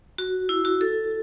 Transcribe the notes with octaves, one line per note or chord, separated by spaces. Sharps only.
F#4
E4
F#4
A4